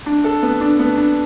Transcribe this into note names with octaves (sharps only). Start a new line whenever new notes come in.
D4
A4
B3
D4
B3
D4